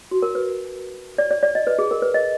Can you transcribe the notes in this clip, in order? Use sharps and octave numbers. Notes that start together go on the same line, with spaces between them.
F#4
A#4
B4
D5
D5
D5
D#5
B4
G#4
A#4
B4
D#5